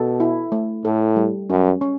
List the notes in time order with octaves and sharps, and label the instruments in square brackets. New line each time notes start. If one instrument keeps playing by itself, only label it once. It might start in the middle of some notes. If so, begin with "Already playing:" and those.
Already playing: [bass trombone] B2 [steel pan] A4
[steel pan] E4
A3
[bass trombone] A2 [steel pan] A4
[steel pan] G3
[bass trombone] F#2 [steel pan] C#4
[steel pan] C#4